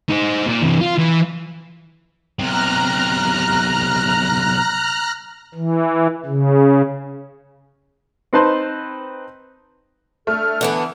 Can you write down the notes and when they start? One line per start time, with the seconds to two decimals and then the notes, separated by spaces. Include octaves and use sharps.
0.09 D#4 C5
0.46 A#2
0.62 C3 E3
0.81 F4
0.98 E3
2.39 B1 C3 A#5 F6 F#6
5.55 E3
6.26 C#3
8.33 C4 D#4 B4 C5 A5 C6
10.27 A3 D4 A4 F6
10.61 D3 E3 B3 D4